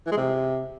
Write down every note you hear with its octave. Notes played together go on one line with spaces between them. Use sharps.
E3
G#3
C3